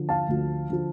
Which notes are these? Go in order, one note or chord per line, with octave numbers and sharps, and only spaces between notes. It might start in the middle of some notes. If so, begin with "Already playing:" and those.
Already playing: D3 F3
F5 A5
D2 D3 F3
D3 F3